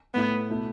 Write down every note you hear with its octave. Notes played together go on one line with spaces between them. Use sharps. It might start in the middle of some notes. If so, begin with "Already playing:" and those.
A2 A3 B3 E4 A4
B2 A3 E4